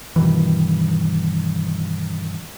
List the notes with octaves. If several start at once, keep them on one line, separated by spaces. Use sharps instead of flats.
G2 B2 D#3 E3